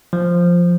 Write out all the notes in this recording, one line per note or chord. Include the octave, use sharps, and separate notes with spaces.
F3